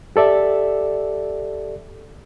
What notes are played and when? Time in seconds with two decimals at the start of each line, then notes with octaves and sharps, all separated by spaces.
0.16 G4 A4 D5 E5